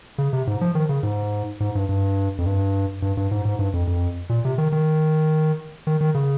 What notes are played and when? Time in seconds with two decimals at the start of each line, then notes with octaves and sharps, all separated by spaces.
0.18 C#3
0.33 C3
0.47 G#2
0.61 F3
0.75 D#3
0.89 C#3
1.03 G#2
1.60 G#2
1.75 G2
1.89 G2
2.38 F2
2.46 G2
3.02 G2
3.17 G2
3.31 G#2
3.45 G#2
3.59 G2
3.73 F2
3.87 F2
4.29 A#2
4.45 C3
4.58 D#3
4.72 D#3
5.87 D#3
6.01 D#3
6.15 C#3